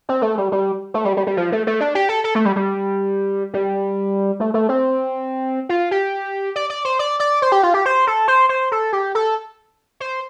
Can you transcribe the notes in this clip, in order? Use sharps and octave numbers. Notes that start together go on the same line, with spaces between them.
C4
A3
G3
G3
A3
G3
G3
G3
F3
A3
A3
D4
G4
A4
A4
A3
G3
G3
G3
A3
A3
C4
F4
G4
D5
D5
C5
D5
D5
C5
G4
F4
G4
C5
A4
C5
C5
A4
G4
A4
C5